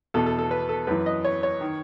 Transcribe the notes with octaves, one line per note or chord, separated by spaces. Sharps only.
E2 B2 A4
A4
A4
B4
A4
F#2 E3 B4
D#5
C#5
C#5
D#3